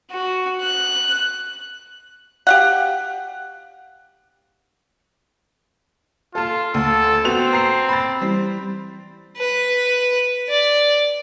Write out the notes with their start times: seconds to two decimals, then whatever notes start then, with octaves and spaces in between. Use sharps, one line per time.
0.12 F#4
0.61 F#6
2.47 G4 F5 F#5
6.35 F4 A4 A5
6.74 D2 A4
7.25 B3 C4 F#4 F7
7.53 A#5 C7
7.89 B5 A6
8.21 E3 G3 C4
9.37 B4
10.49 D5